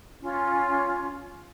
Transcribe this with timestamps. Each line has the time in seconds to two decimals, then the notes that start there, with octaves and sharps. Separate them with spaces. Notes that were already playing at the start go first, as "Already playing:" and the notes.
0.21 C#4 F4